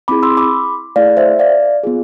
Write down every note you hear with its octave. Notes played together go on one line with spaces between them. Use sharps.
C4 E4 G#4 B5 D6
C6 E6
B5 D6
A3 E4 G#4 D5 F5
C5 E5
D5 F5
B3 F4 G#4